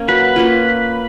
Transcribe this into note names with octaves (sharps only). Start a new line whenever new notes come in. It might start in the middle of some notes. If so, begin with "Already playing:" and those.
Already playing: A#3 C#4
F#3 B4
A#3 C#4 F4